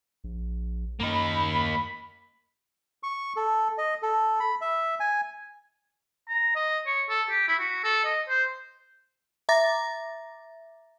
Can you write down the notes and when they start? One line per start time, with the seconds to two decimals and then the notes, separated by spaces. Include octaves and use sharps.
0.24 A#1
1.01 F#2 A#3 D#4 B5
3.03 C#6
3.36 A4
3.78 D#5
4.02 A4
4.40 B5
4.61 E5
5.00 G#5
6.28 A#5
6.55 D#5
6.86 C#5
7.09 A4
7.30 G4
7.48 E4
7.59 F#4
7.84 A4
8.04 D#5
8.28 C5
9.49 E5 A#5 D6 A6 A#6